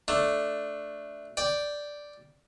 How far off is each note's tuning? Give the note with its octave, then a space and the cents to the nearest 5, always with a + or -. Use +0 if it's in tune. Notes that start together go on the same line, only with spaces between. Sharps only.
A3 +0 D4 +0
D5 +0 G5 +0